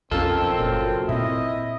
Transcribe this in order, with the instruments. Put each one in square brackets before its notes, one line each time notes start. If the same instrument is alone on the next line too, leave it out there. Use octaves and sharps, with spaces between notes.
[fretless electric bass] B1 F2 C#4 [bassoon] D#3 [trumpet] C4 [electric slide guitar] F4 A4
[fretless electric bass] F#1 A#2 [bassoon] F#2
[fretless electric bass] A#2 C4 [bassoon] E4 [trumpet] D#5